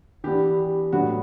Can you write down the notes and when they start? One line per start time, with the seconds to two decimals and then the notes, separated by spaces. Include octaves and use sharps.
0.24 E3 B3 D4 G4
0.58 G4
0.93 A2 F#3 B3 D4 F#4